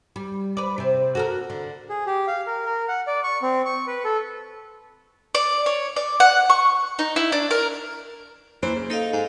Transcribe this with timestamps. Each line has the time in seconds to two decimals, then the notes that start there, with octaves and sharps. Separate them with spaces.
0.16 G3
0.57 B4 D5
0.78 C3 C4
1.15 F#4 A4 A#4
1.50 D3
1.89 G#4
2.07 G4
2.28 F5
2.47 A#4
2.66 A#4
2.88 F#5
3.07 D5
3.24 C#6
3.42 C4
3.65 C#6
3.87 B4
4.05 A4
5.35 D5
5.66 C#5
5.96 D5
6.20 F#5
6.50 C#6
6.99 D#4
7.16 E4
7.32 D4
7.51 A#4
8.63 E3 A#3 C5
8.76 C#3
8.90 D#4 A4 D#5 F5
9.13 G#2